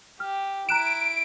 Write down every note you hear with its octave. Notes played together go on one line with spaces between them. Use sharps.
G4 F6
E4 A#5 F#6 D7 E7